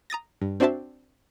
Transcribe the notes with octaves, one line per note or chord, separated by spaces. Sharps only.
A#5 D#6 A6 A#6
G2
C4 D4 F#4 C5 E5 A5